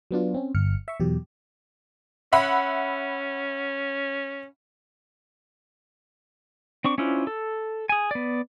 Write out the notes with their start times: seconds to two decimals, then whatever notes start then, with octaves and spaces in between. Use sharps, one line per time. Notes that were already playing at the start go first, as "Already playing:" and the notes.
0.11 F#3 B3 D4 F4
0.34 C4 C#4
0.55 G1 F6 C#7
0.88 E5 C#6
1.00 E2 B2 F#3 G4
2.33 C#4 E5 F#5 B5
6.85 C4 D4 C#6
6.98 C#4 D4 E4 F4 C5
7.27 A4
7.89 G#4 G#5
8.11 B3 D5